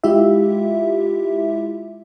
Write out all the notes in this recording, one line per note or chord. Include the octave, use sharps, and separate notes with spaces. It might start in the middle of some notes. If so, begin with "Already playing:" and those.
G#3 E4 F4 G4 E5